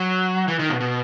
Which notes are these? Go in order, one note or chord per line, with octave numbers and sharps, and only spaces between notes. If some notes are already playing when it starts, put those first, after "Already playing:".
Already playing: F#3
E3
D#3
B2
B2